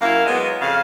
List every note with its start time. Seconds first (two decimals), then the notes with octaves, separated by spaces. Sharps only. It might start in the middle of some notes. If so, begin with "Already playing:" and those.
0.01 F#2 A#3 E4 F5
0.26 F#3 G#3 B3
0.61 F2 C#3 F5